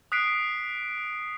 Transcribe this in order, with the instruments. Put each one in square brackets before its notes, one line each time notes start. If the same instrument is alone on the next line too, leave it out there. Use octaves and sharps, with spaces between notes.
[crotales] D#6 F#6 B6 C7 D7